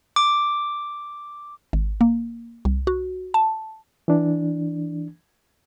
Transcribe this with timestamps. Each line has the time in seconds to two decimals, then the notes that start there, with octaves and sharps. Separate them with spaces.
0.16 D6
1.73 G#1
2.01 A#3
2.65 C2
2.87 F#4
3.34 A5
4.08 E3 D4